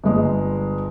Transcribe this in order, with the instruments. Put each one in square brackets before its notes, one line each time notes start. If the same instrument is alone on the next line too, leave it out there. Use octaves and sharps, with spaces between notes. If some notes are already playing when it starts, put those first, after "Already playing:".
[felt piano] G1 G#3